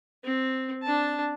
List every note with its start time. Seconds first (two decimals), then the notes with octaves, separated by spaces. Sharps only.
0.24 C4
0.83 D4 A5